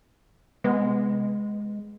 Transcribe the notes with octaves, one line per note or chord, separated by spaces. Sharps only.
C3 G#3 B3